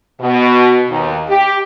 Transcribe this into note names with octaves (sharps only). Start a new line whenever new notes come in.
B2
D#2
G4